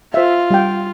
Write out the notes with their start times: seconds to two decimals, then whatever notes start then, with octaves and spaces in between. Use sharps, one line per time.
0.14 F4 C5 E5
0.50 G3 F#5 G5